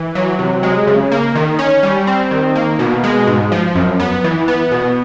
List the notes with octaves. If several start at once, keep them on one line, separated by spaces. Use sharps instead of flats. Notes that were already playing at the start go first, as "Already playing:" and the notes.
Already playing: E3
F#3
C3
G#3
C#3
A#3
D#3
C#4
G3
C4
D#3
A#3
B2
G#3
G#2
F3
F#2
B3
E3
B3
B2